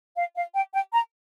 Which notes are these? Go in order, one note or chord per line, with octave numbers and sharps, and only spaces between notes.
F5
F5
G5
G5
A#5